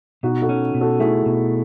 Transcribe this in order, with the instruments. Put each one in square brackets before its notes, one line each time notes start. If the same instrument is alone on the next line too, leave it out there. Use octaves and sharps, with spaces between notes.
[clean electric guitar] B2 [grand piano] D#4 F#4
[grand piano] F#4 A4
[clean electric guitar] C#4
B2
[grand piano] F#4 A4
[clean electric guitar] A3 [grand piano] E4 G#4
[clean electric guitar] B2